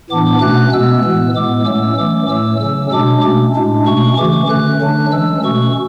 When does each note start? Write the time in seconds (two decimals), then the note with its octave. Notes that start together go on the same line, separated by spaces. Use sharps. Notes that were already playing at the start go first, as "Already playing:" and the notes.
0.10 A2 E3 B3 D4 D6
0.41 B2 A3 C#4 F#6
0.72 B2 G#3 B3 E6
1.04 A2 E3 B3
1.35 A2 G#3 B3 D6
1.66 A2 F#3 A3 C#4 E6
1.98 E3 A3 C#4 D6
2.30 A2 F#3 A3 E6
2.61 C#3 F#3 C#4 E6
2.92 B2 G#3 D4 D6
3.23 B2 A3 C#4
3.54 A2 G#3 D4
3.86 B2 A3 C#4 C#6
4.17 C#3 E3 A3 C#4 D6
4.49 D3 A3 C#4 F#6
4.81 D3 F#3 A3 D4
5.12 E3 G#3 C#4 E6
5.44 B2 A3 C#4 C#6